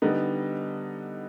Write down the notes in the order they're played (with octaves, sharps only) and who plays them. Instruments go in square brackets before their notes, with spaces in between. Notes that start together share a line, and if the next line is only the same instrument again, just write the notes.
[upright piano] D3 G3 B3 D#4